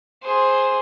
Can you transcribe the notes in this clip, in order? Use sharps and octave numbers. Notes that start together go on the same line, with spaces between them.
G#4 C5